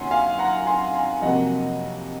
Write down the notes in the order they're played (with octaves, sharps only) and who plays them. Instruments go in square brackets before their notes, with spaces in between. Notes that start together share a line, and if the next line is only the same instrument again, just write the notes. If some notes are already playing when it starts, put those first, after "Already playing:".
Already playing: [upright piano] F#2 D#3 A#3 C#4 F#5 G#5 C6
F5 G#5
F#5 A#5
G#5 C6
G#5 C6
F2 C3 F#3 A#3 D#5 F#5